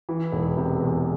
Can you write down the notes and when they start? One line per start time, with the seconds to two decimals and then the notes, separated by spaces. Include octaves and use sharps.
0.09 E3
0.32 E1
0.57 C3
0.80 E2